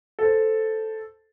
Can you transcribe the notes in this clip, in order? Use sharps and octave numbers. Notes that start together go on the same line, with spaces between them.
A4 C5